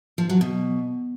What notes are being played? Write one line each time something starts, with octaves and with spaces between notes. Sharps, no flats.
F3
F#3
B2